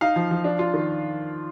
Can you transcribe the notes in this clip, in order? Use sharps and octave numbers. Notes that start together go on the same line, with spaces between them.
D#4 F5
F3
F3
D4
F4
D#3